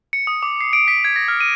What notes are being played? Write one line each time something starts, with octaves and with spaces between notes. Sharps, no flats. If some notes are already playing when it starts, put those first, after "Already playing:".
C#7
D#6
D6
C7
D7
B6
G#6
A#6
F6
D#7